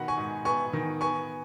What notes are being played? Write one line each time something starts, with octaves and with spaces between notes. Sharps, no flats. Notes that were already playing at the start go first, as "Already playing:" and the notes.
Already playing: B2 D#3 F#5 B5
G#5 C#6
G#2
B3 G#5 C#6
D#3
B3 G#5 C#6